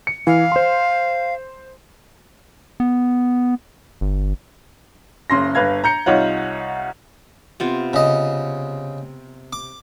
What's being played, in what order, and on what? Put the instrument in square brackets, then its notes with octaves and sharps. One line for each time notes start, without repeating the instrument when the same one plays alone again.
[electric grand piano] C#7
[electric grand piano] E3 [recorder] F5
[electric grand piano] C5 C6
[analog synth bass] B3
G1
[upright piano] F#1 C#3 C6 A#6
G1 B4 F5 G#6
A#5 G6 C#7
C2 D#4 F4 C#5 F#5
[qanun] C3 B3 F4
[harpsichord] C#3 D#5
D6